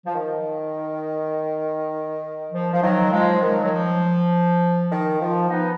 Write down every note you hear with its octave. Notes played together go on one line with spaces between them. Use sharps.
F3
D#3
F3
F3
D#3 F#3
F3 G#3
D#3 F#3
F#3
F3
D#3
F3
B3 D#4